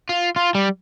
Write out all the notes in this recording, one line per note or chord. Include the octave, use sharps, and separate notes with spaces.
F4
F4
G3